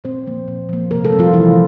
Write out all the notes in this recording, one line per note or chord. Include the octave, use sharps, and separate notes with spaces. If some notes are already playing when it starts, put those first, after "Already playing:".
A#2 C4 C5
F3 A#3
A#2
F3 A#3
C3 A#3 A#4
A3 A4
G3 C4
F3 F4
C3 E3 E4